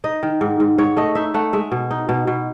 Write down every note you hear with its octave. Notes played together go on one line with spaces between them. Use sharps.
D#4 D#5
D#3
G#2
G#2
G#2 C#5
A3 D#5
D#4 E5
A3 F#5
G#3 E5
B2
D#4
B2
B2